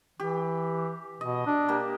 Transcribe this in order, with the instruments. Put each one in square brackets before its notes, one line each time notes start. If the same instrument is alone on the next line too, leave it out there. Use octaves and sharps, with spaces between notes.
[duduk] E3 [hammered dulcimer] G4
[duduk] B2 [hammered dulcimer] D#5
[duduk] D4
[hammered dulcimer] A#3 G4